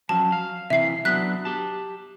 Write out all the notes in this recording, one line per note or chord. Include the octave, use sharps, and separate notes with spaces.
F3 F#3 C#4 A5
F5
C3 E3 E4 E5 C7
F#3 B3 D4 F#6 B6
G4 A5